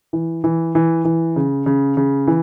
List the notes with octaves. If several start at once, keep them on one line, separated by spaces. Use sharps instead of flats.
E3
E3
E3
E3
C#3
C#3
C#3
E3